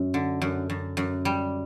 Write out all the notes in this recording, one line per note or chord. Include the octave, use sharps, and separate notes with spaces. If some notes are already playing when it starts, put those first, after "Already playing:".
Already playing: F#2
D3
F#2
F#2
F#2
G3